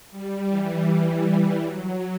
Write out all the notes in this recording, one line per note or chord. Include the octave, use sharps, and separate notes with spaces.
G3
E3
G3
G3
F#3